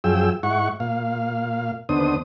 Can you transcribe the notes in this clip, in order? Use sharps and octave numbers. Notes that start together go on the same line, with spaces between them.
F#2 F3 G#4 G5 E6
G#2 E4 F#5 C#6
A#2 F5
D#2 D3 B3 D4 C5 D#6